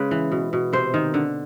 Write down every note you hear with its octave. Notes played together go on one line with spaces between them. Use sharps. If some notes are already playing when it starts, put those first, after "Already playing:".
Already playing: C#3 G#3 B4
E3
B2
B2
C3 C5
D#3
D3